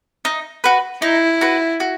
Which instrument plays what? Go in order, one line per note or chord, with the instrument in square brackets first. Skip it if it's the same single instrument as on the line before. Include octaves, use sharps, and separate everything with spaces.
[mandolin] D#4
F#4 B4
[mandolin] D#4 [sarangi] E4
[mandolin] F#4 B4
F#4